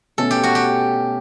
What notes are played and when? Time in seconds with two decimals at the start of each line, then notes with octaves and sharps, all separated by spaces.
0.18 B2 A3 C#4 A4
0.31 G4
0.43 F#4
0.55 G4